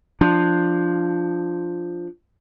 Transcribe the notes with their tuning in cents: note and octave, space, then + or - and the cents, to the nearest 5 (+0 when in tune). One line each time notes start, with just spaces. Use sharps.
F3 +0 D4 +10